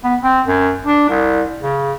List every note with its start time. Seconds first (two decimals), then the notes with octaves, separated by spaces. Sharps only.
0.04 B3
0.23 C4
0.47 F#2
0.85 D4
1.09 C2
1.62 C#3